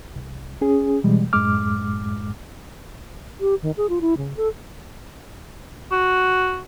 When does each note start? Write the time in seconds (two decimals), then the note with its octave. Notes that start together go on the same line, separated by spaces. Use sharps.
0.16 C2
0.61 C#4 G#4
1.04 B2 E3 G3 G#3
1.33 F#2 A2 G#3 D6 F6
3.40 G4
3.62 D#3
3.77 G#4
3.89 F4
4.01 E4
4.17 C#3
4.37 A4
5.92 F#4